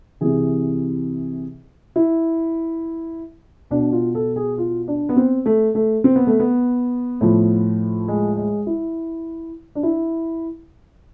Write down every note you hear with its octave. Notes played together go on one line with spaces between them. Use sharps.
C3 E3 G#4
E4
B2 D4
F4
A4
G#4
F4
D4
B3
C4
A3
A3
C4
B3
A3
B3
A2 F3
G#3
G#3
E4
D4
E4